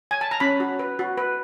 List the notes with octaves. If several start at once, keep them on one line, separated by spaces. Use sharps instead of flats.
G#5
A5
A#5
C#4 B5
F#4
B4
F#4
B4